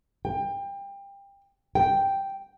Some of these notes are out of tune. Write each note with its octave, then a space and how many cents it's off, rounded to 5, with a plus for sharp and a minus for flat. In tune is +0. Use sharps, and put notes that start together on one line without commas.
G5 +25
G5 +0